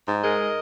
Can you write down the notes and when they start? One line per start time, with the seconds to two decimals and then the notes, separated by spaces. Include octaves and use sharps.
0.08 G#2
0.24 G#3 A#4 D#5